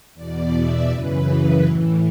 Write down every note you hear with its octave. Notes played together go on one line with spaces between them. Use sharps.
E2 B2 D5
E5
F#2 C#3 E3 B4
A2 E3